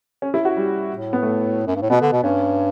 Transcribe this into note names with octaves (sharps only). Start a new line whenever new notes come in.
C#4
E4
F#4
G3
A2
B3
A3
F#2
G2
A2
B2 B3
D3
B2
G2 C#4